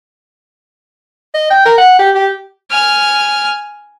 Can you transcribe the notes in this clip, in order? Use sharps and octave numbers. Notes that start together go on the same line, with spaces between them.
D#5
G5
A#4
F#5
G4
G4
G#5 F6